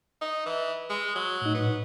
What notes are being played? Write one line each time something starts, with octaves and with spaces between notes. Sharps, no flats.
D#4
E3
G#3
F#3
A2 D#4
B3